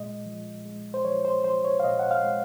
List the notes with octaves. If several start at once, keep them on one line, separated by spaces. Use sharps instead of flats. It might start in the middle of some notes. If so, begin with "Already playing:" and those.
Already playing: A#2 G#3 D#5
F3
G#3
C5
F3 C#5
C5
F3 C5
C#5
F5
A#2 D#5
F#5
F5
G#3